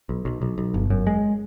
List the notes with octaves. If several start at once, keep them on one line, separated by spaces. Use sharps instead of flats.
B1
B1
B1
B1
G1
F#2
G#3